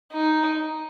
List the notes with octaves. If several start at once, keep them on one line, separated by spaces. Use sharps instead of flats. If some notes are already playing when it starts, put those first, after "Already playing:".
D#4